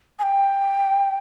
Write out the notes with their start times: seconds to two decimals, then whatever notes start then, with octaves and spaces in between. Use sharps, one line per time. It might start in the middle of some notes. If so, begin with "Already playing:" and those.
0.19 G#5
0.23 G5